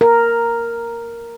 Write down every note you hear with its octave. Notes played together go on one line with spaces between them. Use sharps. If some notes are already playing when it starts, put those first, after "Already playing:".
A#4